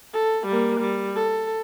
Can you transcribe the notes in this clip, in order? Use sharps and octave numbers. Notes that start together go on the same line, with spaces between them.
A4
G3 A#3
G3
A4